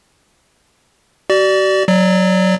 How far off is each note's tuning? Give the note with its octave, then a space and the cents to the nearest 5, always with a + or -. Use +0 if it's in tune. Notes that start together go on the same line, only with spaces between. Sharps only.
F#4 +45 D5 +5
F#3 +0 D5 +25